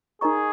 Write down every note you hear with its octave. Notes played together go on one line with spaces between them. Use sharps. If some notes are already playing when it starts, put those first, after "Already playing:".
D#4 G#4 A#4 D#5 A#5 C#6